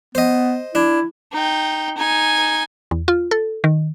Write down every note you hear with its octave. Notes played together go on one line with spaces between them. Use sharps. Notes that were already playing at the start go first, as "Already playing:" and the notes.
B3 C5 D#5
D4 E4
D#4 G5
D#4 G#5
E2
F4
A4
D#3